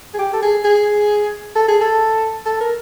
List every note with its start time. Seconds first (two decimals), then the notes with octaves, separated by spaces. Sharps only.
0.14 G#4
0.19 G4
0.33 A4
0.42 G#4
0.65 G#4
1.56 A4
1.68 G#4
1.81 A4
2.46 A4
2.61 A#4